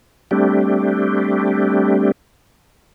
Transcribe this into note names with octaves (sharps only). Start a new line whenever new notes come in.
G3 A3 C4 D4 G4